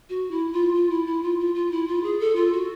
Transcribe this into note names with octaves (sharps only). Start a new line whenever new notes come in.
F#4
E4
F4
F4
E4
E4
F4
F4
F4
E4
F4
G#4
A4
F4
F#4